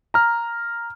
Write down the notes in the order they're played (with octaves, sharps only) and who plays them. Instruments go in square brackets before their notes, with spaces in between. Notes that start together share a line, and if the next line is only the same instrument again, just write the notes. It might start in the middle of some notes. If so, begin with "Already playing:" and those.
[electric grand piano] A#5 F6